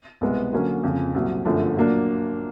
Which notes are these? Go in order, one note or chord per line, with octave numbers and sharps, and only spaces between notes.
C2 B2 G#3 B3
D3 F#3 A#3 C#4
F2 C#3 F3
C2 A#2 F#3
G1 F#2 D3 F3 A3
A#2 F#3 A#3 D4